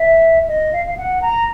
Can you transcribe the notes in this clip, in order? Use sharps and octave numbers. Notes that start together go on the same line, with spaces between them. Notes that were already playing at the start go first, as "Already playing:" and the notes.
Already playing: E5
D#5
F5
F5
F#5
A#5